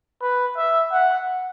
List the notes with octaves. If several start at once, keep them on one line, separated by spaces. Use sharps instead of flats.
B4
E5
F#5